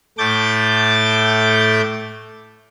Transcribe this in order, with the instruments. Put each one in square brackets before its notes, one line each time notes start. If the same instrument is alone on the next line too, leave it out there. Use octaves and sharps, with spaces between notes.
[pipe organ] A2 A3 D6 G6 A6